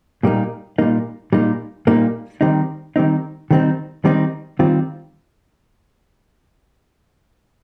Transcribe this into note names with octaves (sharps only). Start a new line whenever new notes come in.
A#2 G3 A#3 D#4
A#2 G3 A#3 D#4
A#2 G3 A#3 D#4
A#2 G3 A#3 D#4
D#3 G3 C4 D#4
D#3 G3 C4 D#4
D#3 G3 C4 D#4
D#3 G3 C4 D#4
D#3 G3 C4 F4